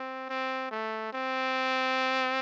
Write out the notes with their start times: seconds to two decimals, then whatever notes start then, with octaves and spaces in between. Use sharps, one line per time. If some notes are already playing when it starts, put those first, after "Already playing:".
Already playing: C4
0.30 C4
0.71 A3
1.13 C4